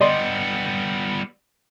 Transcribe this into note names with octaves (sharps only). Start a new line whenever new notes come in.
G3 B3 D5 D#5 C6